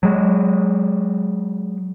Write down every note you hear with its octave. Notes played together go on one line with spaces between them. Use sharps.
F#3 G#3